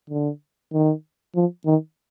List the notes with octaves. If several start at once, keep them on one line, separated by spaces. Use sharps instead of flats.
D3
D#3
F3
D#3